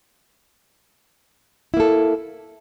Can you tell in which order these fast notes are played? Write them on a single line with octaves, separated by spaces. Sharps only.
E4 A#3 A4